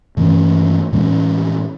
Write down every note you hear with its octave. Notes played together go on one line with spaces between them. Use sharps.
G2 E3 A3 C#4
A2 E3 G#3 C#4